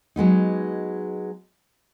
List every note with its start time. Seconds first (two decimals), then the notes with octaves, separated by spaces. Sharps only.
0.16 F#3 G#3 B3 D#4